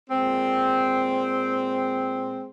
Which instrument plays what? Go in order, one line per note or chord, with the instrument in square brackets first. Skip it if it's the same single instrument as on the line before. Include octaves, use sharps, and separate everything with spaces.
[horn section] A#2 G#3 C4